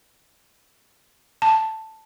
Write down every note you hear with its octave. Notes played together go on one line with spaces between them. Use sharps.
A5